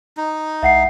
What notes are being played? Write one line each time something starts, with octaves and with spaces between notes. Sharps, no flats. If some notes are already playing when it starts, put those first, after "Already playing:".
D#4
C2 E5 F#5 C7